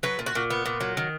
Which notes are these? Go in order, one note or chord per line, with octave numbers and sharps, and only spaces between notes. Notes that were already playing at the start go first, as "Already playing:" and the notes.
F#3 B4
A#2
F#4
A#2
B3
A#2
F#3
D#3